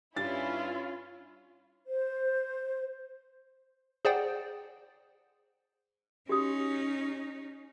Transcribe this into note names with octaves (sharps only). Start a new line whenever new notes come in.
G2 C#4 E4 F4 A6
C5
G#4 C5 D5 F#5 G5
C#4 D#4 F#4 G4 D#6